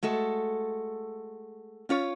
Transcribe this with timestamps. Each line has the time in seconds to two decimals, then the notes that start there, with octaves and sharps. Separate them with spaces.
0.03 G#3 A3 F#4 A4
1.89 C#4 F4 C#5